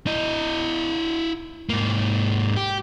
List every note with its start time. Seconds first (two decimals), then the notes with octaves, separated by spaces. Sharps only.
0.07 E4 D#5
1.69 G#2 A#3
2.56 G4